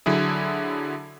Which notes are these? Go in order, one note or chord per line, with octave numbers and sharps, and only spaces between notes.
D3 F#3 E4 G#4